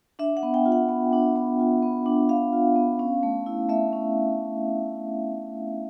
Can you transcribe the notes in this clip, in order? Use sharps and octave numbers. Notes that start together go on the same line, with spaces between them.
D4 E5
F#5
B3
G5
F4
F#5
B3
D4
B3
F4
B3
D4
B3 F5
F4
B3
C#4
A3
E4
A3 E5
C#4